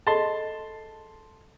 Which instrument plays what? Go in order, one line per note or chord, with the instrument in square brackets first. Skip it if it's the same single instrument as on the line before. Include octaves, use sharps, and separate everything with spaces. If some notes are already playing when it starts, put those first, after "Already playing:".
[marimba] G#4 A4 D#5 [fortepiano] A5 C6